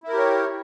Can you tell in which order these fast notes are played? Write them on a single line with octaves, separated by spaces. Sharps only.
E4 A#4 G4 C#5